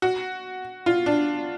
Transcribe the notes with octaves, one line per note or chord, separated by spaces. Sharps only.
F#4
F4
D4